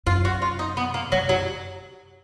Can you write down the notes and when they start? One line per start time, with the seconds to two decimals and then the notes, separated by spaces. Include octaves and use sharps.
0.06 F#2 F4
0.25 F#4
0.42 F4
0.59 D#4
0.77 B3
0.94 A#3
1.12 F#2 F#3
1.29 F#3